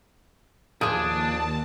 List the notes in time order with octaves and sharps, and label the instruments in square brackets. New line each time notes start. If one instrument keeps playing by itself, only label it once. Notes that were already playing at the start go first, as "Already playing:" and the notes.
[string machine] D#2 A5 [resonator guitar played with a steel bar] F3 G#4 [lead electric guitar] D4 [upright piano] D#6